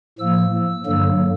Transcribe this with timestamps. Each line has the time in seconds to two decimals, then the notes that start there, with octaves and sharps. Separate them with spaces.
0.19 A2 F3 A#3 E6
0.86 G2 D3 F#3 A#3